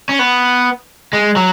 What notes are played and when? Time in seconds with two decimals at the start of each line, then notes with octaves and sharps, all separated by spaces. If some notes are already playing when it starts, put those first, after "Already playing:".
0.09 C#4
0.19 B3
1.13 G#3
1.36 F#3